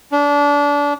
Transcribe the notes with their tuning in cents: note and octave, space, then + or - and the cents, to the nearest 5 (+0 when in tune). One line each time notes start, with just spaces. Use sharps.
D4 -25